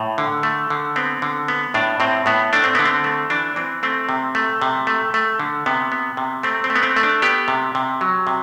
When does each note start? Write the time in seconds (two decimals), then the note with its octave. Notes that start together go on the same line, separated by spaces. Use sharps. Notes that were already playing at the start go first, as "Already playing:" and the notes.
Already playing: A2
0.18 D3
0.43 A3
0.70 D3
0.96 B3 C4
1.22 D3
1.48 B3
1.74 A2 D4
2.00 A2 C4
2.26 A2 B3
2.53 A3 D4
2.64 C4
2.75 D3 B3
2.85 C4
3.04 A3
3.30 E3 D4
3.56 E3 C4
3.83 A3 C4
4.09 C3
4.35 A3
4.62 C3
4.87 A3
5.14 A3
5.40 D3
5.66 C3 B3
5.92 B3
6.17 C3
6.43 A3 C4
6.64 C4
6.70 A3
6.76 B3
6.83 C4
6.96 A3
7.03 D4
7.22 B3 G4
7.48 C3
7.75 C3
8.01 F#3
8.27 C3